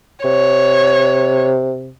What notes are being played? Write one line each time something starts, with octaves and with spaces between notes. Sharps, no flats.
C3 C#5